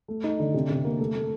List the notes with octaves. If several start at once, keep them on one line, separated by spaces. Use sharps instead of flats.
A3
D#4
D3
C3
C3
A#3
A3
A3